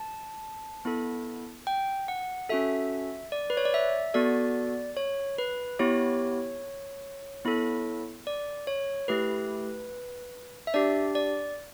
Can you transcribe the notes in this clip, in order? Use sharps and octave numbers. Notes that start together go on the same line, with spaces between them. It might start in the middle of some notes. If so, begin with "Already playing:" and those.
Already playing: A5
B3 E4 A4
G5
F#5
C#4 F#4 A4 E5
D5
B4
C#5
D5
E5
B3 F#4 A4 D5
C#5
B4
B3 E4 G4 C#5
B3 E4 A4
D5
C#5
A3 E4 G4 B4
E5
D4 G4 D5
D5